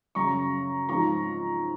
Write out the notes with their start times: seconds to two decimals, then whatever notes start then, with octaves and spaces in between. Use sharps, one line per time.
0.15 F#2 C#3 F#3 A#5 C#6
0.89 G#2 F3 C4 F4 A#5 C#6